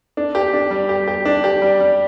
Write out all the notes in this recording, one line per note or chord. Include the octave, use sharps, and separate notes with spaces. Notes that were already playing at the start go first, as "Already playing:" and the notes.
D4
G4
D4
G3
G4
G4
D4
G4
G3
G3